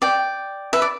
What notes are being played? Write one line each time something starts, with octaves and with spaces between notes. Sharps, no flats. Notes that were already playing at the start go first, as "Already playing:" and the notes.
D5 G5
B4 E5
D5